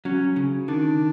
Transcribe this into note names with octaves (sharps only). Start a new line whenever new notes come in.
F#3 C#4
C#3
D#3 D4